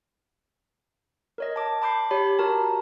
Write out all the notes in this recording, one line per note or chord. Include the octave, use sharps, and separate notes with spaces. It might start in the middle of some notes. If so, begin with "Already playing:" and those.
A#4 C#5 D#5
A5 D6
A5 B5 D6 G6 C7
G4 C#5 B5
F#4 A#4 A5 A#5